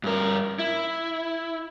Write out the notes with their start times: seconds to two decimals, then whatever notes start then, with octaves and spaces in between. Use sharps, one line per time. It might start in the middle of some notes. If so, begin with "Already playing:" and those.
0.04 G2 A#4
0.59 E4